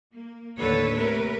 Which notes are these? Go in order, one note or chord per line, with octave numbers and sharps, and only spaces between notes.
A#3
D#2 A2 D3 A4 B4 C#5
C3 A3 A#4 B4